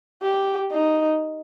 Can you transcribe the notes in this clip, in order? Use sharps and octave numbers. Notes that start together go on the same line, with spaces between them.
G4
D#4